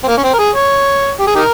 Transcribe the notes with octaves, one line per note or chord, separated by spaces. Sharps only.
C4
A#3
C#4
C4
A#4
G#4
C#5
G4
G#4
D#4 G4 A#4